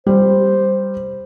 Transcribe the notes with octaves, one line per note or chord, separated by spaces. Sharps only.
G3 C5